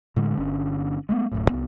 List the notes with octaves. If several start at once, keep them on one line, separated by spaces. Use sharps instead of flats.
A2 D3 G#3
G1 D3 C#4
G#3 A3 B3
D1 C2 F#2 A2
C2 F2 B3